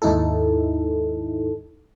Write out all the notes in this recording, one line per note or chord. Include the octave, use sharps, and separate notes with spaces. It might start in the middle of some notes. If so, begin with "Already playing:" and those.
D#2 G#2 D#4 E4 A4